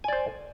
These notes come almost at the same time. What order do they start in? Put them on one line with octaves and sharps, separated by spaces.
G#5 D5 C5